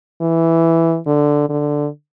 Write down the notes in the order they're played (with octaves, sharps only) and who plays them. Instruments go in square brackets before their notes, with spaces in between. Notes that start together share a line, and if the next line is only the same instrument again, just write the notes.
[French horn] E3
D3
D3